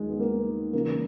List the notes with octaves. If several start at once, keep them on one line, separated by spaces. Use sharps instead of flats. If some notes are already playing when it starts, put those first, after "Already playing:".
Already playing: D#2 D#3 G#3
B3
A#3
C#2 C#3 E3 A#3